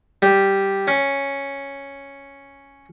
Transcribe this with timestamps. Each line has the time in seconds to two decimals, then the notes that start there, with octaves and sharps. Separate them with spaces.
0.22 G3
0.88 C#4